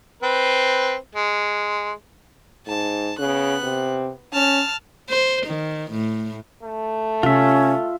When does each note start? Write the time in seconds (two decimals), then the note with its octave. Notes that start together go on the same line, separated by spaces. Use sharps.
0.23 C4 B4
1.15 G#3
2.67 G#2 A5
3.19 C#3 B3 F#6
3.64 C3
4.33 C#4 A5 F6
5.09 C5
5.46 D#3
5.91 A2
6.63 A3
7.23 C3 C#4 F4 E5